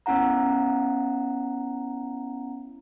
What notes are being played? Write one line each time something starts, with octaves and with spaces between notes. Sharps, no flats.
B3 C#4 E4 F#5 A#5